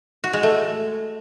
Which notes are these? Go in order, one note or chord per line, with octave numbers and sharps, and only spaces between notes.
F#4
G#3
A3